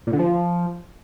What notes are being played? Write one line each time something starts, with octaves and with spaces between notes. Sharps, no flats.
A#2
D3
F3